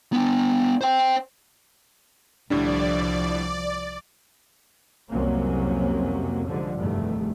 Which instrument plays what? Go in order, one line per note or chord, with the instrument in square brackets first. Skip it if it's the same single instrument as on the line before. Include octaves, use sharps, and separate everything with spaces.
[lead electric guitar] B3 D4
C5 G5
[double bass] C2 F3 [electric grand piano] A2 D3 G3 [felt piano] D4 [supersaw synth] D5
[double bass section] C2 F2 C3 F#3 A#3 C#4
G#2 D3 F3 G3
F1 E2 G2 D#3 A3